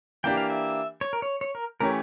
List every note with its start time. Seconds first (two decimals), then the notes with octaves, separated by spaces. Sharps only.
0.24 E3 A#3 D4 G4 G5
0.37 F5
0.50 E5
1.01 C#5
1.13 A#4
1.22 C#5
1.41 C#5
1.55 A#4
1.80 E3 A3 C#4 G4 A#4 C#5